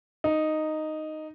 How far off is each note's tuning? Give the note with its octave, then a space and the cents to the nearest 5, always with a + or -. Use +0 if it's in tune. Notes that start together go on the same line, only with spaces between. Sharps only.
D#4 -5